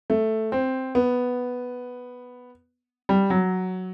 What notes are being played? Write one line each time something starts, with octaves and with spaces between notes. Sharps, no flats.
A3
C4
B3
G3
F#3